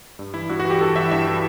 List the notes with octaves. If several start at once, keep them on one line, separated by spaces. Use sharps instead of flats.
G2
E3 E4
G2 F#4
F#4
E3
G4
G2 A4
E3 E5
G2 E5
E3